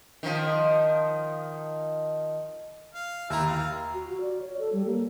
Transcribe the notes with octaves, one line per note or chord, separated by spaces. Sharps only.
D#3 F3
F5
D#2 E4 A#5 E6
F5
F#4
F#4
D5
C#5
A4
G3
A#3